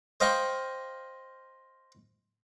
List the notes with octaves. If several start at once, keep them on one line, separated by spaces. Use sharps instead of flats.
C5 D#5 F5 G5 B5 C#6